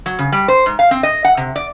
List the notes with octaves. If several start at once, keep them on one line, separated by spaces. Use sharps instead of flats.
F#3
C#3
G3
C5
G#2
F5
C4
D#5
F#5
C3
D5